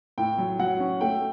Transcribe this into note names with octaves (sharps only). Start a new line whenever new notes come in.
A2 G5
F#3
F#3 F#5
C#4
A3 G5